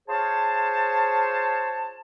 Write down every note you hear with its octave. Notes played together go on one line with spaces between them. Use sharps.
F4 G#4 C5 C#5 A5